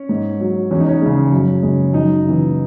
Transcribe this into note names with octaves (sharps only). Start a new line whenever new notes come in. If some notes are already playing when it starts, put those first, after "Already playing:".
Already playing: C#4
G#2
F#3
E2 C#4
D#4
C#4
C#3 G#3
F#2
C#3 G#3
F#2 D#4
C#3 E3